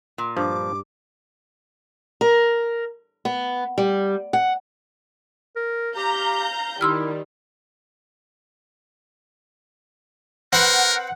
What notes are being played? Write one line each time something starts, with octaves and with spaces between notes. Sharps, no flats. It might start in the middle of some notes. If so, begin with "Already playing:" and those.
A#2
G2 F3 D6
A#4
B3
G3
F#5
A#4
G4 F5 A#5 G6
D#3 G3 E4 C6 E6 F6
C4 A#4 B4 F#5